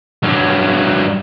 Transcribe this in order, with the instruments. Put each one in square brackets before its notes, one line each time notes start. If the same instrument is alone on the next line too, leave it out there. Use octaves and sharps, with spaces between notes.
[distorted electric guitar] G2 F#3